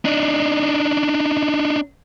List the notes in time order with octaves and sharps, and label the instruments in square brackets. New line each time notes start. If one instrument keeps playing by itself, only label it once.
[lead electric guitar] D4 D#4